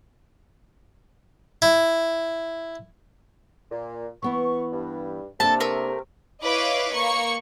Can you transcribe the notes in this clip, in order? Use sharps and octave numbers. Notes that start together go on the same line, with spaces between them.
E4
A#2
E3 B3 E4 C#6
G2
C3 A#3 D4 A4 A5
A3 A#4 E6
E4 B4 C#5 D#5 F5 D6
A#3 C#6 C#7